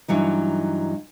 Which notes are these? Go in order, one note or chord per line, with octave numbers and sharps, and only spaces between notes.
G2 E3 F#3 D#4